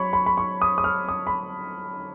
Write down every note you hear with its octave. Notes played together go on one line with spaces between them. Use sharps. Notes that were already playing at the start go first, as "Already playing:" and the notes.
Already playing: F#3 C#5 B5 C#6
B5
B5
C#6
D#6
D#6
F6
D#6
B5